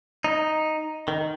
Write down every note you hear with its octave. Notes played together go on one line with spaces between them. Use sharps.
D#4
D#3